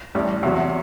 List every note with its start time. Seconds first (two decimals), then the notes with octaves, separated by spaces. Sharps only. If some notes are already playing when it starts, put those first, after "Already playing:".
0.15 A1 A2 G3
0.43 E2 C3 F#3